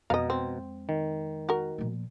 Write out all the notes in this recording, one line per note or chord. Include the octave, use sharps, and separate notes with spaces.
F2 B2 G#3 D#5 F5 A#5
C4
D#3
F#4 A#4
A#2 F3